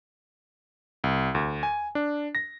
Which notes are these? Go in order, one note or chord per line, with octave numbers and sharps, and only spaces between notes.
C2
D2
G#5
D4
A#6